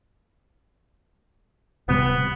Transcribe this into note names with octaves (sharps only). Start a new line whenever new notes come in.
D1 C3 G3 B3